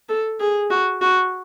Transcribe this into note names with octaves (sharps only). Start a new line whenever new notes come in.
A4
G#4
F#4
F#4